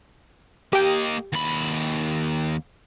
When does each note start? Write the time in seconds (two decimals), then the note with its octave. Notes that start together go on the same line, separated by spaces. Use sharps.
0.73 A#3 G4 D#5 G5
1.33 D#2 B5